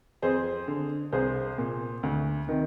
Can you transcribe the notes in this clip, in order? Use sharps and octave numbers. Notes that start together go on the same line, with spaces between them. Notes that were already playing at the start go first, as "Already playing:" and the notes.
F2 G#4 C5
D3
C2 G#4 C5
A#2
D2
C3 D#3